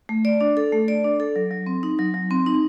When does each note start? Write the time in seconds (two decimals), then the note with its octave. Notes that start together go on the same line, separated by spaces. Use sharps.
0.09 A3
0.25 D5
0.41 D4
0.57 A4
0.72 A3
0.88 D5
1.04 D4
1.20 A4
1.36 F#3
1.51 F#3
1.67 C4
1.83 D#4
1.99 F#3
2.14 F#3
2.31 C4
2.46 D#4